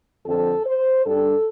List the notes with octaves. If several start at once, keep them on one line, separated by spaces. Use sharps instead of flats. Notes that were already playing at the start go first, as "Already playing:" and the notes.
F2 D3 F3 A4
C5
G2 G3 D4 A4